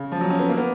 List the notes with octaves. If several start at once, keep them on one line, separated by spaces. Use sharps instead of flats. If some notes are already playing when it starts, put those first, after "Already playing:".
Already playing: C#3
F3
F#3
C#4
B3
A#3
B3